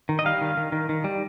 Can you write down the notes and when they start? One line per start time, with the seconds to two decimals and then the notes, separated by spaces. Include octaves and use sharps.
0.09 D#3
0.19 D#5
0.25 G3 F5
0.41 D#3
0.57 D#3
0.72 D#3
0.89 D#3
1.04 G3